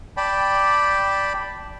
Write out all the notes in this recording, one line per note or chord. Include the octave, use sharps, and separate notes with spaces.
D5 G5 A5 B5